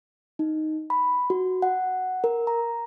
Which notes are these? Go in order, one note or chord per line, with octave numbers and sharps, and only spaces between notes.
D#4
B5
F#4
F#5
A#4
A#5